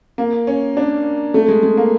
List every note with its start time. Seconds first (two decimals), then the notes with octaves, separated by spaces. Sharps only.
0.18 A#3
0.47 C#4
0.77 D4
1.34 A3
1.48 G#3
1.63 G#3
1.77 A#3